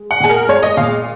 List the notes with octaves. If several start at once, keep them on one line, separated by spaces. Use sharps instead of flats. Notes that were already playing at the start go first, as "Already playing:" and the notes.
Already playing: G#3
F#5
A#2 G#4
A#4
G#3 C#5
D#5
A#2 F5